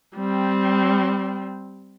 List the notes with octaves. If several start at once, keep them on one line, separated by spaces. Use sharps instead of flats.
G3 C4